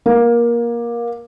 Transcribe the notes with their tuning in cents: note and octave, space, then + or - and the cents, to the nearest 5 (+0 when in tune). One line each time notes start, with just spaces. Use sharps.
A#3 +20